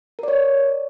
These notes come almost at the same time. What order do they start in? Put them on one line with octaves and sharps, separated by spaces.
A#4 D5 C#5